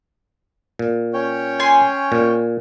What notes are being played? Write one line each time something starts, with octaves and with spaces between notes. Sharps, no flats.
A#2
C#4 C#5 G5
G#5 C6
A#2